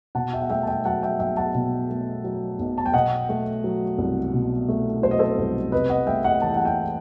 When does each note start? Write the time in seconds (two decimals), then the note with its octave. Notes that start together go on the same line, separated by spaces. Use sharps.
0.15 B2 F#5 A5
0.33 E5 G5
0.42 F#5
0.50 A3 E5 G5
0.63 A5
0.67 E5 G5
0.85 F#3 F#5 A5
1.03 E5 G5
1.19 B1 E5 G5
1.37 F#5 A5
1.55 B2
1.90 A3
2.24 F#3
2.59 B1
2.78 A5
2.86 G5
2.93 B2 D#5 F#5
3.29 A3
3.64 F#3
3.98 C2
4.33 B2
4.68 A3
5.02 F#3 C5
5.11 D#5
5.19 A4 C5
5.38 C2
5.72 C3 B4 D#5
5.89 D#5 F#5
6.07 A3 E5 G5
6.24 D#5 F#5
6.41 E3 A5
6.49 G5
6.57 F#5 A5
6.65 E5 G5